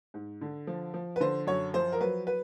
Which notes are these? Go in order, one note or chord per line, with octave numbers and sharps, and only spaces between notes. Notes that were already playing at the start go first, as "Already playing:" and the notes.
G#2
D3
F3
F3
B4
D3 C5
F#2 C#5
F3 C5
A#4
F#3 B4
B4